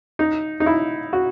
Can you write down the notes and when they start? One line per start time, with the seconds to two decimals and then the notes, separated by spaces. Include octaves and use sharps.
0.19 D#4
0.60 D#4
0.66 E4
1.13 F#4